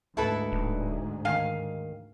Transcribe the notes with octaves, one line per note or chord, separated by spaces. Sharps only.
D2 G#2 E4 A4 B4
D1
D#3 F5 G#5